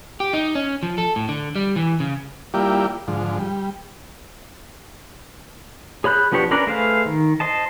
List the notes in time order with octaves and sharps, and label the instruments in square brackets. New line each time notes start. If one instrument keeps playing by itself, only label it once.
[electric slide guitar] G4
D#4
C#4
F3
A4
A2
D3
G3
E3
C#3
[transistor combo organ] G3 A#3 E4 F4 G4 D5
G#2 D3 F3
G3
[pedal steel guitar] G#4 C#5 B5 F#6 G6
F3 B3 D4 G4 C#5
C#4 D4 A#4 B4 D5
A3 G#4 B4 C5 F5
D#3
C5 D#5 A5